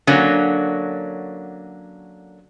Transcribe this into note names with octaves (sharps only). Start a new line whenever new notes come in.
D3 F#3 A#3 C#4